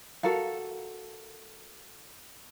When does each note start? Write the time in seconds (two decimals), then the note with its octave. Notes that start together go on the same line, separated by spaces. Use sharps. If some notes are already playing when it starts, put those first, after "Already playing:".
0.23 F#4 A4 A#4 F5